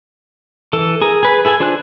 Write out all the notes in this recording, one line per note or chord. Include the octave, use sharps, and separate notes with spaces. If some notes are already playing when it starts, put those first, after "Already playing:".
E3 A4
G#4 A#4
G#4 B4
E4 G#4 A4 G#5
D4 F4 C5 G#5 F#6